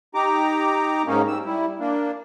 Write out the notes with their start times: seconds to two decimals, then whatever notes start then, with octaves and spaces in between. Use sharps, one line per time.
0.15 D#4 G4 A#5 D6
1.07 G#2 A#3 C#4 D#4
1.28 G3 E6
1.45 G3 E4
1.80 A#3 D4